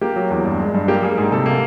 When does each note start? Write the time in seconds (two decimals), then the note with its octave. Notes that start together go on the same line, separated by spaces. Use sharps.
0.01 A#3 G4
0.16 F#3
0.30 E2
0.45 G2
0.60 G#3
0.74 G2
0.88 A#3 G4
1.02 G3 G#4
1.17 G#2 G#4
1.32 C3 A4
1.46 A#3